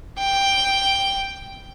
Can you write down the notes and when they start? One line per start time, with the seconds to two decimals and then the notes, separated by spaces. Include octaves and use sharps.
0.19 G5